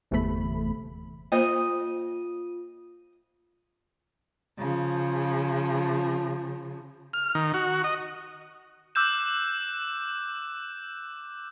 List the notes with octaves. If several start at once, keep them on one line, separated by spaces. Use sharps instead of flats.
G1 E2 C3 A3 B5
A#3 F4 C5 D#5
C#3 F3
F6
D#3
F#4
D#5
D6 E6 F#6 G6 E7